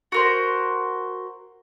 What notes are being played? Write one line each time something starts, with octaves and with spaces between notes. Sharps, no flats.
F#4 A#4 C5